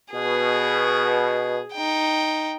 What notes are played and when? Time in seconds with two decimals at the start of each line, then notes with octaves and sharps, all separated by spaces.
0.12 B2 G#4
1.73 D#4 G5